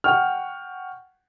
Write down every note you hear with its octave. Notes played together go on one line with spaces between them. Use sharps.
F#5 G5 C#6 F6